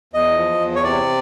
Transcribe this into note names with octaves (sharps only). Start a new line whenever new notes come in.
E2 D#5
F3
E2
C#5
C3 D5